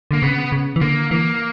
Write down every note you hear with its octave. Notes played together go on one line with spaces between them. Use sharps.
D3 A#3
C#3 B3
C#3
E3
D3 A#3
E3 A#3